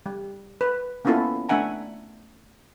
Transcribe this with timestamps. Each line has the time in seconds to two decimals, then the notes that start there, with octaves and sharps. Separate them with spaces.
0.06 G3
0.61 B4
1.05 A#3 B3 C#4 E4 F4 A4
1.49 A3 D4 E5 F#5 G#5 A#5